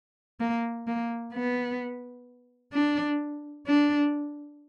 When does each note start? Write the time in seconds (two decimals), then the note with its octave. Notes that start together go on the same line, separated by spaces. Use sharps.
0.40 A#3
0.87 A#3
1.34 B3
2.73 D4
3.67 D4